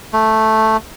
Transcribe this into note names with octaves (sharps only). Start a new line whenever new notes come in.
A3